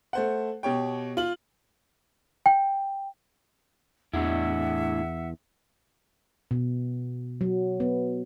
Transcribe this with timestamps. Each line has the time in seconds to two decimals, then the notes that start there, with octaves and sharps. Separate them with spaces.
0.13 A3 C5 F#5
0.63 B2 G4 C#5 G5
1.17 F4 F#7
2.46 G5
4.13 E2 A2 D4 E4 E5 F#5
6.51 B2
7.41 F#3
7.80 B3